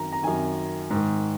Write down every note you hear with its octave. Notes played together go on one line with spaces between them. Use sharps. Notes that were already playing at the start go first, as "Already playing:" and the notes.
Already playing: F#2 D#3 A#5
A#5
F#2 D#3 G#5
G#2 D#3